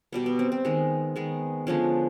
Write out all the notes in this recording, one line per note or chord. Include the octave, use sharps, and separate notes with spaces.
B2 G3 B3
B3
C4
C4
D#3 G#3 B3
D#3 G#3 B3
D3 F3 G#3 B3 C#4